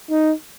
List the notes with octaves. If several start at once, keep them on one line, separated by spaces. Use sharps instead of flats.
D#4